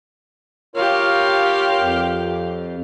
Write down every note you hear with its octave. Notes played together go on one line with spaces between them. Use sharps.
F4 G4 A#4 C#5 F5
F2